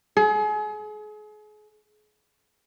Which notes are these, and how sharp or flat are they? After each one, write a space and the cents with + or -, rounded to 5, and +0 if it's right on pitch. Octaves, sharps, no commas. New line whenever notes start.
G#4 +35